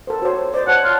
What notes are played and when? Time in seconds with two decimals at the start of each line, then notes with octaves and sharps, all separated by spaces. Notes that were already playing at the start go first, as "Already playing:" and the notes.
0.07 A4 A#4 C5
0.22 F#4 C5 C#5
0.54 C5 D5 D#5
0.67 C#5 F#5 A5
0.85 F4 C#5